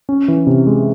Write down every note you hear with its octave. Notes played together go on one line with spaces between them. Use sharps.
C#4
E3
C3
G#3